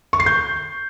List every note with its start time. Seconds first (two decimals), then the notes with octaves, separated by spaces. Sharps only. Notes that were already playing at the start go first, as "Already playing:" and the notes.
0.13 C#6
0.20 C7
0.26 G6